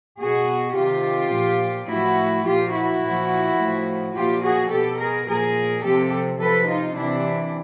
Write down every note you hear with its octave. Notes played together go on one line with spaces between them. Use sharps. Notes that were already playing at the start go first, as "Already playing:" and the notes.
B2 F#4 G#4
C3 D#3 F4 G4
A#2 F3
A2 F3 E4 F#4
A#2 F3 F4 G4
E4 F#4
A#2 F3
A2 F3
A#2 F3 F4 G4
F#4 G#4
B2 G4 A4
G#4 A#4
A#2 F3 G#4 A#4
C3 F3 G4 A4
C3 F3 A4 B4
D#4 F4
C3 E3 D4 E4